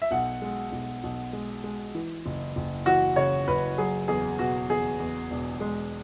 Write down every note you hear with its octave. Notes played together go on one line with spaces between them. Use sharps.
E5
B1 F#5
G#3
B1
B1
G#3
G#3
E3
F#1
F#1
E3 F#4
C#3 C#5
F#1 B4
F#3 G#4
E2 G#4
B2 F#4
E2 G#4
E2
E1
G#3